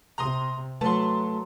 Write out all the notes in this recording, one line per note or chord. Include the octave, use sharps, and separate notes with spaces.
C3 A#5 C6 D#6
F#3 A3 B4 A5 C6